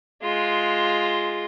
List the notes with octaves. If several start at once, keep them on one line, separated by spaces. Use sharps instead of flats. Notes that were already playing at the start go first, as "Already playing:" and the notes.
G#3 F4